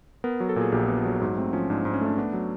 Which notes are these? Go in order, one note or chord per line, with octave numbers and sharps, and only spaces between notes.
B3 A#4
F#3
A4
A#2 G#4
A#1 G4
B3
F#3
G#2 F#4
A3 C4
F3 C#4
G#2 D4
G#2
C#4
A3 D4
B3 D4
F#3